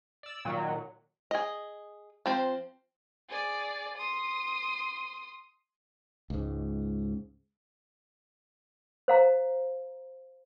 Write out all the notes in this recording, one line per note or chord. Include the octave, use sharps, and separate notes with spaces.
D5 E6
A#2 D#3 F#3
G#4 D#5
F3 C4 C5
G#4 D5
C6 D#6
C#2 G#2
C5 F5 A#5